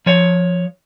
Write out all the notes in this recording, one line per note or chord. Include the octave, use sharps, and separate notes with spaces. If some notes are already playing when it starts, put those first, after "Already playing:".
F3 C#5